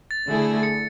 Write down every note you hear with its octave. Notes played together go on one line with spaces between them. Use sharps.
A6
D3 A3 E4 G#4
C#7